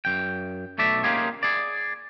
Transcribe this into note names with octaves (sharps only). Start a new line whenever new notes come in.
F#2 G5
B1 A3 D5 E5
A#3 C#4 D#4 F4 G4 G#4
G#4 D5